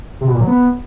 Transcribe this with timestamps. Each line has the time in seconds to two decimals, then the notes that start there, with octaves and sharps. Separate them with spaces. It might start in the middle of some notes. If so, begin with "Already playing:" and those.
0.21 C3
0.27 B2
0.34 A#2
0.41 F#3
0.47 B3